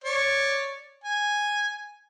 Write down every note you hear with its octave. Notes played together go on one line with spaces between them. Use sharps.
C#5 D5
G#5